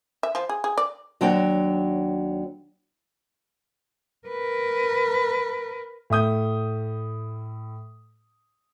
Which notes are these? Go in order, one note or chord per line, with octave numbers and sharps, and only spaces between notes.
E5
F3
G#4
G#4
D5
D#2 F#3 D4 C#5 G5
A#4 B4
A2 E5 D#6 G6